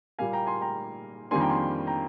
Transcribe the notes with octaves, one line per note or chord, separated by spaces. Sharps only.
A#2 G3 A#3 F5 G#5
G5 A#5
G#5 C6
G5 A#5
F2 D#3 G3 A#3 D4 G#5 C6
G5 A#5
G#5 C6
G5 A#5